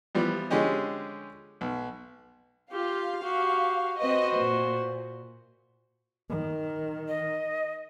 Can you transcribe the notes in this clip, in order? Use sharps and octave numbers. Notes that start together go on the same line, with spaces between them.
E3 F3 G3 B3
D3 F3 G#3 C#4 G4 D#5
B1
F4 G4 F5
F#4 G4
C4 F#4 B4 C5 D#5
A#2
D#3
D#5